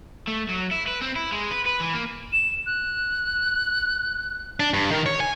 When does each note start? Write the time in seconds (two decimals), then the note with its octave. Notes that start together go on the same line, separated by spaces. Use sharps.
0.27 A3
0.49 F#3
0.71 E4
0.87 B4
1.01 C4
1.16 E4
1.32 G#3
1.51 B4
1.66 B4
1.80 E3
1.94 A#3
2.33 E7
2.66 F#6
4.60 D4
4.74 G2
4.91 D#3
5.06 C#5
5.20 G#5